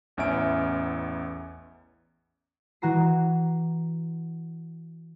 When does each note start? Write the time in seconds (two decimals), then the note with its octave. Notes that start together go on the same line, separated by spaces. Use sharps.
0.17 A1 E2 C#4 E5 D7
2.82 E3 F#4 A#5 C7